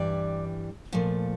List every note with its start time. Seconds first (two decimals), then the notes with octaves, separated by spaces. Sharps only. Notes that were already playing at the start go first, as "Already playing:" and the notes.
Already playing: G2 E3 G3 D5
0.93 A#2 F3 A3